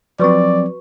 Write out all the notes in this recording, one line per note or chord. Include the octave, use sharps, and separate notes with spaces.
F3 F#3 C4 F#4 B4 D5 C#6